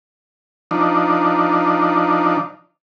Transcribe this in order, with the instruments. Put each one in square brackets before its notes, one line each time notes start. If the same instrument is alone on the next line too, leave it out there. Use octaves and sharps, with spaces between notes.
[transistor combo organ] F3 D4 D#4